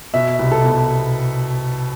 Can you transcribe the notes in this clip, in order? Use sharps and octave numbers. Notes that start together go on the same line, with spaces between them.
B2 E5
C2
A4
B2